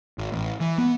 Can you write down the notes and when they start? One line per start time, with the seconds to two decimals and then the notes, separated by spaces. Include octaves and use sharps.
0.18 G#1
0.32 A1
0.60 E3
0.78 B3